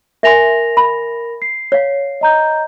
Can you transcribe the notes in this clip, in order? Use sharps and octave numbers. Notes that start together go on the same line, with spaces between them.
A#4 E5 G#5 C6 A#6 F7
B5
C7
C#5 F5
D#5 A#5 G6